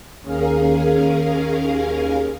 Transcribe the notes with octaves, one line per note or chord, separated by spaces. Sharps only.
D#2 C#4 G#4 A#4 F5